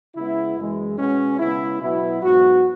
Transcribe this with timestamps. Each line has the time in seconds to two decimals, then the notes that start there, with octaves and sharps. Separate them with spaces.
0.15 C#3 G#3 B3 E4
0.57 F#2 E3 G#3
0.98 B2 G#3 B3 C#4
1.39 C#3 G#3 B3 E4
1.81 B2 F#3 B3 E4
2.22 G#2 F#3 B3 F#4